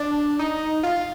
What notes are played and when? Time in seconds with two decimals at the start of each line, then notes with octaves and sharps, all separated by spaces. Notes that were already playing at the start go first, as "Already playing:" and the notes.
Already playing: D4
0.39 D#4
0.83 F4